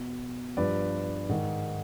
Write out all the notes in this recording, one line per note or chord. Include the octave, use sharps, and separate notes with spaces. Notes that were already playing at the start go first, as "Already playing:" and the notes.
Already playing: B2
G2 F3 B4 D5
G#2 D#3